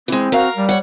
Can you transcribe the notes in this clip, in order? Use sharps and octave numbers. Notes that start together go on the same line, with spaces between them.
E3 G#3 C4
F#4 A#4 F5
G3 D5
C#5 F#5